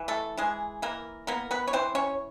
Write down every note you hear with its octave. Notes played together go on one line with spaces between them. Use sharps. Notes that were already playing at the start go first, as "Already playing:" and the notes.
Already playing: E3
A3 A4
E3 G#3 G#4
E3 A#3 A#4
A#3 B3 A#4
B3 B4
C#5
E3 C4 C5
C#4 C#5